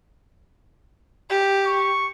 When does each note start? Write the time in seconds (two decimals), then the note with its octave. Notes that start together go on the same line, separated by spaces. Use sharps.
1.30 G4
1.66 C#6